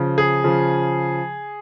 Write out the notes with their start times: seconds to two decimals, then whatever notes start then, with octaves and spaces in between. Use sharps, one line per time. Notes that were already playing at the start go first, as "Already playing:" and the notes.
Already playing: C#3 F3
0.18 G#4
0.44 C#3 F3